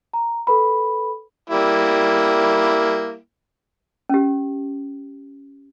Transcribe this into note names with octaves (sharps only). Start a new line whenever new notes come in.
A#5
A4 B4 B5
G3 A#3 E4
C#4 G4